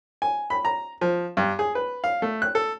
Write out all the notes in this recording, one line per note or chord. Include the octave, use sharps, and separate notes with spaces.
G#5
B5
A#5
F3
G2
G#4
B4
F5
A3
F#6
A4